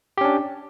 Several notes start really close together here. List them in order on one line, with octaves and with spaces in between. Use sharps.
G4 C#4 D4